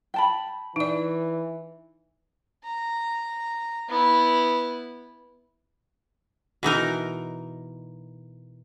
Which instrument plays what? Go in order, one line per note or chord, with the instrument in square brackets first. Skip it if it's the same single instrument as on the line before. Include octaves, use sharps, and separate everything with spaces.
[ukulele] G5 A5 B5
[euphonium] E3 [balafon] D#4 D5
[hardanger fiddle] A#5
B3 E4
[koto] B2 E3 D#4 A#4